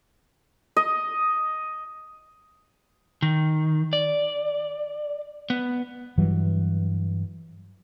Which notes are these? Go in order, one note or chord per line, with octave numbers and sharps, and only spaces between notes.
D#5
D#3
D5
B3
G2 E3 F#3